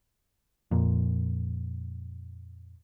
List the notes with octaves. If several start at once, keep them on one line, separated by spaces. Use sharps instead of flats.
F2 A#2